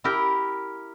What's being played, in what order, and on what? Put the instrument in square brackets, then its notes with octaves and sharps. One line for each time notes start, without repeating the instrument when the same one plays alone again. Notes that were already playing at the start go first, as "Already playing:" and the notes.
[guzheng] E4 G4 A#4 G5